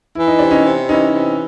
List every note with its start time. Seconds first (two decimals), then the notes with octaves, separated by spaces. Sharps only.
0.15 E3 E4
0.27 D#4
0.39 C3 D4
0.51 C#4 D#4
0.65 C3
0.89 E3 C#4 D#4
1.13 C3